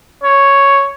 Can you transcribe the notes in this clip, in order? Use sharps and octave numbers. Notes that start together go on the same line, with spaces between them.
C#5